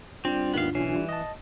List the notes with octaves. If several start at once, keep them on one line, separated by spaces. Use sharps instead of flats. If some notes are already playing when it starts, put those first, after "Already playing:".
G3 C4 D4 F4
D#2 G#2 D#3 B3 F5
B1 E3 C#4 C7
G3
D#5 A5